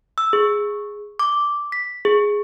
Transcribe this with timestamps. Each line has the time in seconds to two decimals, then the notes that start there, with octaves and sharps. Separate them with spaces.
0.18 E6
0.33 G#4
1.19 D6
1.72 B6
2.05 G#4